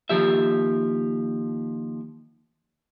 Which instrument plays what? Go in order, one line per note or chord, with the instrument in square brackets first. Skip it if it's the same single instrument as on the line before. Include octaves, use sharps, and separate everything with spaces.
[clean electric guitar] D#2 F3 G4 E5